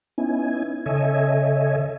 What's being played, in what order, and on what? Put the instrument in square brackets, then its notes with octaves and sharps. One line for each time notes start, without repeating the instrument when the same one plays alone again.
[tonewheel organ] B3 C#4 D#4 E4 G#5
C#3 A4 C#5 D#5 E5 G#5